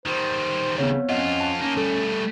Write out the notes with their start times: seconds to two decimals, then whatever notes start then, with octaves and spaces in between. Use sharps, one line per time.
0.06 D#3 G3 C5
0.78 C#3 B3 C4 C#5
1.09 F2 C#4 F4 D#5 F#5
1.41 A5
1.60 A#3 C#4 D#4
1.77 G3 A3 A4